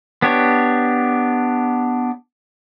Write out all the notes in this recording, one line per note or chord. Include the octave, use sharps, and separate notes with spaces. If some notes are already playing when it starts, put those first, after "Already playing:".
B3 D4 G4 C#5